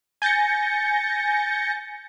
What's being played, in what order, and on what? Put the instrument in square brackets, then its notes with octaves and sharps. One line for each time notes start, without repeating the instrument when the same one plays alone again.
[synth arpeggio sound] G#5 G6 A6 A#6 C#7